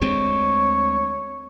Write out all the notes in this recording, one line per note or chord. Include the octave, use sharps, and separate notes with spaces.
D2 G#3 C4 C#5